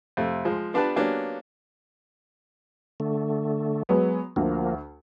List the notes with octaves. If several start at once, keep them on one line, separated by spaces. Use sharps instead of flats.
F2 C3 A3
F3 G#3
B3 D4 F4 G4 B4 A5
F#3 A#3 B3 C#4 D4 G4
D3 A3
F#3 G#3 B3
D2 F3 A#3